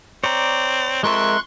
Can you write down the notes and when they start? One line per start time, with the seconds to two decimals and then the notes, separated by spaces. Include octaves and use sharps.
0.24 C4 C#5 D5 A#5
1.03 F2 G#3 A#4 E5 C6 C#6 F#6